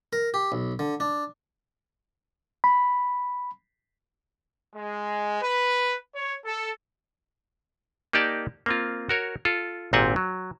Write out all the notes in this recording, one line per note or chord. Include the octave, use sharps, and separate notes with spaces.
A#4
G4
B1
D3
D4
B5
G#3
B4
C#5
A4
A#3 D#4 G4 D5 A5
A#3 C4 F4
F#4 A#4 C#5
F4 A4
G#1 A#2 C4 G4 F#5 G#5
F#3